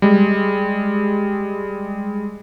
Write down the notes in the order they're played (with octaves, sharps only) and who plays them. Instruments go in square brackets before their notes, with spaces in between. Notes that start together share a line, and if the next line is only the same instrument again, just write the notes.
[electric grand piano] G3 G#3